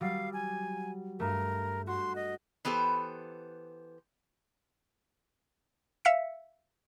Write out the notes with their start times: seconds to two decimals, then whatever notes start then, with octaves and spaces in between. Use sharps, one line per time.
0.01 F#3 G3 F5
0.33 G#5
1.20 G2 A3 A#4
1.87 F#4 C6
2.16 D#5
2.65 E3 B3 G4 A4 C5
6.05 E5 F5 E6 B6 C#7